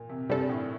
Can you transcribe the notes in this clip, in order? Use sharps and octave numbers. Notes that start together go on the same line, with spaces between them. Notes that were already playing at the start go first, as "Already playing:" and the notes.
Already playing: A#2
C3
G2 C3 G3 D4 A4
A2